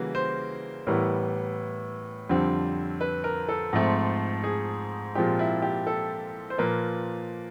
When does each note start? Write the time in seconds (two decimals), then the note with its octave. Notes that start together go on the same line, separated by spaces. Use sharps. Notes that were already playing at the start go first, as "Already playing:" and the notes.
Already playing: C#3 E3 G3 A#3 F#4
0.15 C5
0.87 A2 E3 G3 B3 A#4
2.29 F2 D3 G3 C4
3.01 B4
3.24 A#4
3.49 A4
3.73 G#2 F3 A3 C4
4.44 G#4
5.15 A#2 F3 G#3 C4 G4
5.39 E4
5.62 G4
5.87 A4
6.50 C5
6.58 A#2 F3 A#3 B4